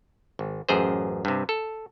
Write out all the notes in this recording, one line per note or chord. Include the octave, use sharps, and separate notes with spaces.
G#1
A1 F#2 G#4 C5
G2 C3
A4